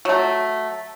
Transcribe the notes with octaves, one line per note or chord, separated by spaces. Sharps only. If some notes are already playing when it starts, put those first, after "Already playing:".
F#3 A3